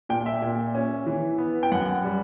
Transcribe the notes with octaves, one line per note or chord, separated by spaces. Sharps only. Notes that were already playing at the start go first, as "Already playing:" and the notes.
A#2 G5
E5
A#2
C#4
E3
B3
G5
F#2 F#5
G3